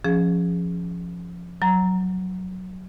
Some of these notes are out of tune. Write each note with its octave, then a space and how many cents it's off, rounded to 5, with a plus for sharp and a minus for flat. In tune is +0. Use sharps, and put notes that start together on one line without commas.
F3 +0 C#4 -5 G#4 -5
F#3 +0 A#5 +0